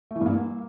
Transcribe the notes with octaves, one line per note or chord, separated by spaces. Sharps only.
A3
E3
G2
A#3